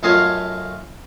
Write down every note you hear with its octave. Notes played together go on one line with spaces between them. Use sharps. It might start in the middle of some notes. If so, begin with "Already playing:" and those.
F#2 A3 F4 D#5 F5 G#5